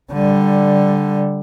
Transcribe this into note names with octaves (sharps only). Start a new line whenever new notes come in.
D3 G3